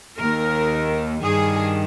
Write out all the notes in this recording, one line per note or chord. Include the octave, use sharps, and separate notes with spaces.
D#2 D#3 A#4
G2 D#3 G#4